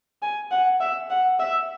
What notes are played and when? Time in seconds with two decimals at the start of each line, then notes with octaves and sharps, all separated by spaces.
0.22 G#5
0.51 F#5
0.80 E5
1.10 F#5
1.39 E5